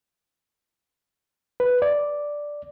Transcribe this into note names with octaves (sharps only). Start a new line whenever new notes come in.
B4
D5